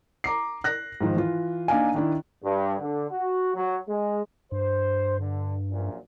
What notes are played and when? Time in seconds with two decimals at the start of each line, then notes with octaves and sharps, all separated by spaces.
0.24 A#5 D6 C7
0.64 F#6 A#6
1.01 G#2 D#3 F3
1.16 E3 F4
1.68 A#3 D4 D#4 F5 G#5
1.94 D#3 D4 E4
2.43 G2
2.79 D3
3.10 F#4
3.55 F#3
3.88 G#3
4.52 G2 C5
5.19 D3
5.71 A#1 F#2 A#2